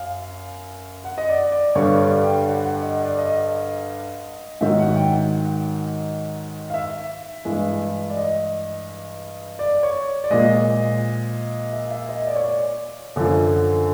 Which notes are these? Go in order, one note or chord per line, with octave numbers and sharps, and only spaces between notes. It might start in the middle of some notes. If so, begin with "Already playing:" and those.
Already playing: F#2 F5
F#5
D#5
D5
D5
G2 D3 G3 C#5
D5
G5
F#5
F#5
D#5
D5
D#5
G#2 D#3 F#3 E5
F#5
G5
F5
E5
G2 E3 G#3
D5
D#5
D5
C#5
D5
A#2 F3 G#3 D#5
E5
E5
D#5
D5
C#5
D5
F#2 D3 F3